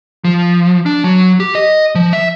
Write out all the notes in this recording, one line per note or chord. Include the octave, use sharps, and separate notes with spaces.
F3
D4
F#3
G4
D#5
F3
E5